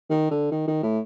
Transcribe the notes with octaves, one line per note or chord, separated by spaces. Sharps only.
D#3
D3
D#3
D#3
A2